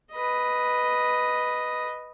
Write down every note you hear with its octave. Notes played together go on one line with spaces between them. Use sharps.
B4 D#5